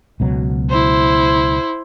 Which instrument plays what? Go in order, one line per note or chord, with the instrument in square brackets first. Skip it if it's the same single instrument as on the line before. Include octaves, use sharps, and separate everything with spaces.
[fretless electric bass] C#2 B2 F#3
[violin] E4 C5